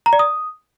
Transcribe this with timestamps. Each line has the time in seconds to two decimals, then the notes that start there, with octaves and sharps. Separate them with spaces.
0.06 A#5
0.13 D5
0.19 D#6